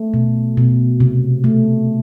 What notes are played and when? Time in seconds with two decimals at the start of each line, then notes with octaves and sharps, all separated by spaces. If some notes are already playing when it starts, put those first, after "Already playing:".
Already playing: A3
0.14 B2
0.57 B2
1.00 C3
1.44 A3